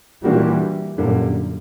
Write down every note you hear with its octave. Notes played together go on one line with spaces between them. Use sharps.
A#2 E3 G3 A#3 D4 F#4
F#2 A#2 D3 G3 A#3